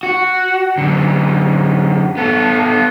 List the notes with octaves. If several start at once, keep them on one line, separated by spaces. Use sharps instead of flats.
F#4
F#2 D3
B3 A4